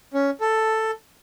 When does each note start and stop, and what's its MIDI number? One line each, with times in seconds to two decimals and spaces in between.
0.14 0.30 61
0.41 0.91 69